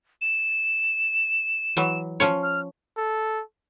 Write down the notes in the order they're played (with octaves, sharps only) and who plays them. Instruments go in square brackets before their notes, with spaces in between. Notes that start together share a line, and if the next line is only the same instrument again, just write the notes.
[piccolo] E7
[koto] E3 F#3
F3 C#4 C#5
[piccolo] F6
[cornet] A4